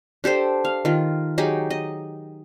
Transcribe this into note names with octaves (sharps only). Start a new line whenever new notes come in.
D4 G4 A4 C5
F5
D#3 F4
F#3 D#4 G4 G#4
D#5